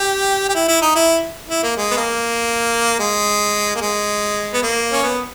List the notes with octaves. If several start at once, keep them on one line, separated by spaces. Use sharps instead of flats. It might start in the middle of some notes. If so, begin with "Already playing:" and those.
Already playing: G4
G4
E4
E4
D#4
E4
E4
A#3
G#3
B3
A#3
G#3
A#3
G#3
B3
A#3
C#4
B3